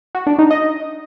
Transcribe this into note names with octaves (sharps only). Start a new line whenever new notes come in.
F#4
D4
D#4
D#5